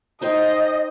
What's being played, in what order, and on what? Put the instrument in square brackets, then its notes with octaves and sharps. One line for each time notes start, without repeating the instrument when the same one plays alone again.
[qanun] D#4 C5 G5 [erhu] D#5